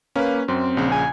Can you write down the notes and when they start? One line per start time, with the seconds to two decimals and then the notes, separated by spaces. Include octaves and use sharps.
0.16 A#3 C#4 B4
0.48 F#2 C4
0.77 A#1 C#3
0.92 G#5